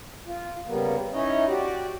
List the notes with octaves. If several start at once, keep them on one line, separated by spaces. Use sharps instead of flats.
F4
C#3 G3 A#3 B3
C#4 D#4 E4 C#5 D#5
F#4 G4 D5